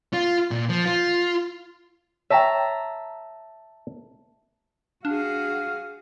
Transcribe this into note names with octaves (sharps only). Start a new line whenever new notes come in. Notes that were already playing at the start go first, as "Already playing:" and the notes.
F4
A#2
F3
F4
C#5 E5 G5 A5 A#5
D4 F#4 G#4 F5